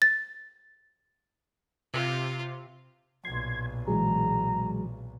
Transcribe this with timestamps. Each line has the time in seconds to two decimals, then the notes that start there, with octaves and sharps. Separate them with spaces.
0.02 A6
1.94 C3 F4
3.25 B1 A#2 C6 G#6
3.88 E3 F#3 G#3 G#4 A#5